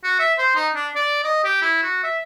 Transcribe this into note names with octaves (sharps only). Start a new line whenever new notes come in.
F#4
E5
C5
D#4
D4
D5
D#5
G4
E4
F#4
E5